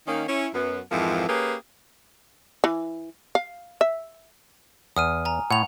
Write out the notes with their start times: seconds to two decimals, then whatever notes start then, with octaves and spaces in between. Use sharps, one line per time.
0.07 D#3 A#3 C#4 D#4
0.28 C#4 E4
0.54 F#2 B3
0.91 F2 G#2 E3 F3 A#4
1.29 A#3 C#4 G4 G#4 B4
2.64 E3
3.35 F5
3.81 E5
4.96 E2 D#6 F6 D#7
5.25 G#5 A#5
5.51 A2 F#5 F7